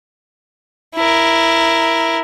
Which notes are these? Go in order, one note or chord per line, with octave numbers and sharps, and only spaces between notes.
E4 A#4